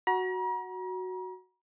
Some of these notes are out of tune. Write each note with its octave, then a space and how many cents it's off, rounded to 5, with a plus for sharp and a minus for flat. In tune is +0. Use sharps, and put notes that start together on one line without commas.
F#4 +0 A#5 +40